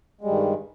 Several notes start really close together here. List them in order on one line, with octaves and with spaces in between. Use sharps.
G#3 G3 G2 D#3